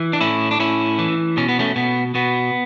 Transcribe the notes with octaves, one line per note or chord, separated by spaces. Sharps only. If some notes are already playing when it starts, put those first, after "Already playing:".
Already playing: E3
D4
A2 C#4 E4
D4
A2 C#4 E4
E3
B2 C#4
B3
A3 C#4
B2 B3
B2 B3